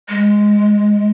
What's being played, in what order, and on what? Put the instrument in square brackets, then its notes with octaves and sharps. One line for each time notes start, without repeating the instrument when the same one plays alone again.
[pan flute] G#3